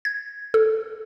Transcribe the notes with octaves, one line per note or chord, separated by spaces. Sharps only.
G#6
A4